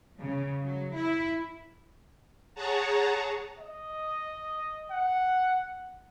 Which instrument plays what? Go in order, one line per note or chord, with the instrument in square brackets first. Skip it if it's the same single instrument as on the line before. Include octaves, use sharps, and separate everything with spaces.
[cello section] C#3
F#3
E4
[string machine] G#4 C#5 F#5 A5 A#5
[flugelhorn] D#5
F#5